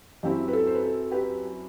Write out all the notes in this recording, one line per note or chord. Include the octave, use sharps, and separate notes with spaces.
F#2 F#3 C4 E4 G4
B4
A4
C5
B4
A4
G4 B4